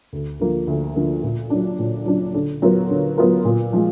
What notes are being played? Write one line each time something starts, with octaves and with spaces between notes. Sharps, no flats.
D2
D3 F3 A#3
D2
D3 F3 A#3
A#2
F#3 D4
A#2
F#3 D4
D3
F#3 B3 F4 A#4
D3
F#3 B3 F4 A#4
A#2
F3 G#3